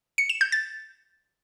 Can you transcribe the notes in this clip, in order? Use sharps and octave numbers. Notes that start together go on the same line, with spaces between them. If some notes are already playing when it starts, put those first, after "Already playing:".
C#7
E7
G6
A6